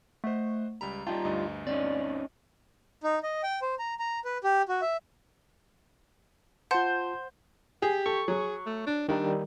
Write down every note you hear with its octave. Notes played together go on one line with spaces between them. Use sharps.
A3 C5 D#5 F#5
C#2 G3 A#5 B5
G3 D#4 F4 G5 A5
D2 G2 D#5
C4 C#4 D#4 D5
D#4
D#5
G5
C5
A#5
A#5
B4
G4
F#4
E5
F4 C5 F#5 A5
G4 G#4
A4 C#6
F#3 G#4
A3
D4
D#3 G3 D4 D#4